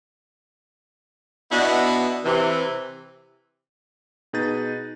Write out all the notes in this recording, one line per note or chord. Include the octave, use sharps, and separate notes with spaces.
B2 B3 D4 E4 F#4 D#5
C3 E3
B2 D#4 G#4 B4 G6 A6